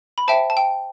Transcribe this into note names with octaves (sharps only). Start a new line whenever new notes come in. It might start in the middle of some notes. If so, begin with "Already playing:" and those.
B5
C5 E5 G5 A5
A5
G5